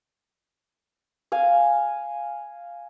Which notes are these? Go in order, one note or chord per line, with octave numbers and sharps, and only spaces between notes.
F5 G#5